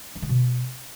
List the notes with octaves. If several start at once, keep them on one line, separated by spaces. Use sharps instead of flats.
D4
D3
B2